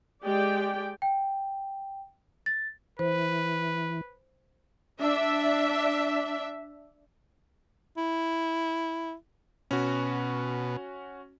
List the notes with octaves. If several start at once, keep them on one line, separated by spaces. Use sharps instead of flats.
G#3 G4 D5 G5
G5
A6
E3 B4 C5
D4 E5
E4
B2 C#4 F#4